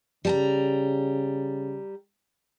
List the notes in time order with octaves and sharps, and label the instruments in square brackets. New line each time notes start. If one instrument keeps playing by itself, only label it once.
[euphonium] C#3 [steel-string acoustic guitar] G3 A5 A#5